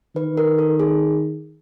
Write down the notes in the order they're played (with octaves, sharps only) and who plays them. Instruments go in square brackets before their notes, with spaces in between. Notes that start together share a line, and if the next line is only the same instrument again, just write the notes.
[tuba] D#3 [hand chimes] B4
[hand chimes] A#4
A4
G#4